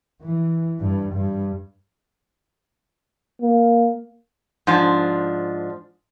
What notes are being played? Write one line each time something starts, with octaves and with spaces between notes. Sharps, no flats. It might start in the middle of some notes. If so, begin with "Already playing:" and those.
E3
G2
G2
A#3
G#2 F3 D4